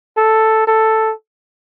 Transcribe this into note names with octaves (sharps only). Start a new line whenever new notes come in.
A4
A4